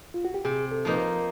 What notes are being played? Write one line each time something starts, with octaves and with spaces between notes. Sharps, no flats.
F4
F#4
G4
C3 G#4
A4
F3 A#3 D#4 B4
A#4